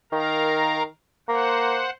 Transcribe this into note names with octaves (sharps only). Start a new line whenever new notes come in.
D#3 A#4 F5 A#5
A#3 C5 F#5